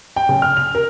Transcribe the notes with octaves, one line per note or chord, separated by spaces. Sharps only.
G5
C#3
F6
F7
A#4